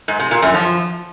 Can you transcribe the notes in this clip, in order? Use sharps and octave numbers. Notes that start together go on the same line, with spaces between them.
G#2
C3
A#2
F#2
F3